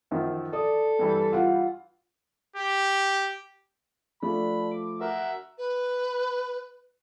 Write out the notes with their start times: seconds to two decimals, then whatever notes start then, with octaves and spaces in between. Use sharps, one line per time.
0.11 F#2 D#3 F3
0.53 A4 D5 D#6
0.99 G2 E3 G3
1.33 F4 F#5
2.56 G4
4.22 F3 A3 D4 B5
4.71 D6
5.01 F#4 A#4 E5
5.58 B4